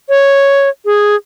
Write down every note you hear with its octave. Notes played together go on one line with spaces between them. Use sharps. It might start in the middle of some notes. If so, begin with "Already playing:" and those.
C#5
G#4